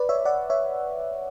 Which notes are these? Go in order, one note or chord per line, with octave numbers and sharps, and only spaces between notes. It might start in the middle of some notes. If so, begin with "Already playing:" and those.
Already playing: B4 D5
C#5 E5
D5 F#5
C#5 E5